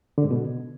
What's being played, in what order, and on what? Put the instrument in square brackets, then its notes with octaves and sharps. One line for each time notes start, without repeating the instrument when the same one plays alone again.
[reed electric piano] D3
G#2
B2